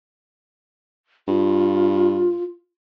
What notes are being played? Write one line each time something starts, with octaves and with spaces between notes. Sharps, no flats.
G2 F4